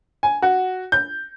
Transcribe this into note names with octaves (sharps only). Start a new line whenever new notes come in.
G#5
F#4
G6